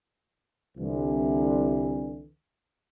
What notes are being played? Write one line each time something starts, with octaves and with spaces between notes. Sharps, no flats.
C2 D3 E3